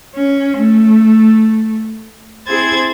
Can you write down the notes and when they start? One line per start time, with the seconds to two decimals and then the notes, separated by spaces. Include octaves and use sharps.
0.16 C#4
0.58 A3
2.47 C4 E4 G#4 C5 G#6 A6